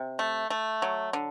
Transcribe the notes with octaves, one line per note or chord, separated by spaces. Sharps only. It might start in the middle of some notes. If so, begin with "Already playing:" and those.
Already playing: C3
A3
A3
F#3
D3